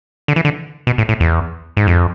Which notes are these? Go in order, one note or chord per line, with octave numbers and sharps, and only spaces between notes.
D3
E3
D3
B2
A2
A2
E2
G#2
F2